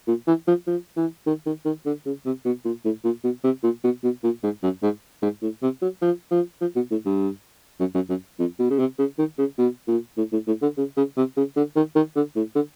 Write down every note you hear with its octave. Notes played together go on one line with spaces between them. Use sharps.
A#2
E3
F3
F3
E3
D#3
D#3
D#3
D3
C#3
C3
B2
A#2
A2
A#2
B2
C3
A#2
B2
B2
A#2
G#2
F#2
G#2
G#2
A2
C3
F#3
F3
F3
F3
B2
A2
G2
F#2
F#2
F#2
F2
B2
C#3
C3
C#3
D#3
C#3
B2
A#2
A2
A2
A2
D3
C#3
C#3
C3
C#3
D3
D#3
D#3
D3
A2
D3